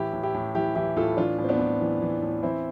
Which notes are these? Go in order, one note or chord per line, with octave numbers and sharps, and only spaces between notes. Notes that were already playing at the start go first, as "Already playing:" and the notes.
Already playing: A2 E3 E4 G4
A2
E4 G4
A2
E3 E4 G4
E3 E4 G4
A2 F4 A4
E3 D4 F4
A2
C4
B3 D4
A2
E3
E3
A2
E3 C4 E4